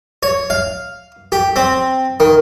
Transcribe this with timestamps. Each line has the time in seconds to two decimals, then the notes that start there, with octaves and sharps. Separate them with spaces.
0.23 C#5
0.50 F5
1.32 G4
1.56 C4
2.20 D#3